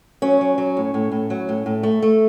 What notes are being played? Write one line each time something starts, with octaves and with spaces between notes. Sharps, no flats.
F#3 C#4
F#3
F#3
A2
A2
A2
F#3
A2
A2
A3
A3